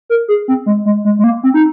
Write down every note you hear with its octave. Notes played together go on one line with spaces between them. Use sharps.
A#4
G#4
C4
G#3
G#3
G#3
G#3
A#3
C4
D#4